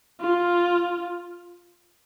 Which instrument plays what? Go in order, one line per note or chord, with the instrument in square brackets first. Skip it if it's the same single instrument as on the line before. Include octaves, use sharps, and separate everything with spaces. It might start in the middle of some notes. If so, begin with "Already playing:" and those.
[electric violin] F4